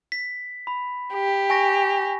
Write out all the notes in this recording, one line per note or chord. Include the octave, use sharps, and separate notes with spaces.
B6
B5
G4
G#5 C#6 A#6